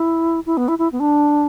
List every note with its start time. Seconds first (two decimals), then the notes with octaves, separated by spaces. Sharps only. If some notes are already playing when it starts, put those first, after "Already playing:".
Already playing: E4
0.46 E4
0.57 B3
0.68 E4
0.78 E4
0.92 B3
1.00 D4